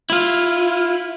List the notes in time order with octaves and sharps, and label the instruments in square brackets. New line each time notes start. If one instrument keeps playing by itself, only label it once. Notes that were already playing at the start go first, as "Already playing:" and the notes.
[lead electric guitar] E4 F4